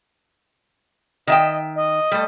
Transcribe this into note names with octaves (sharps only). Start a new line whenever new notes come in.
D#3 D#5 E5 G5
D#5
G3 A3